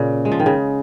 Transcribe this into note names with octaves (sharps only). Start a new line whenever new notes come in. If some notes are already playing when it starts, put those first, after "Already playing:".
Already playing: A#2 C#3
G#3
F3
D#3
C#3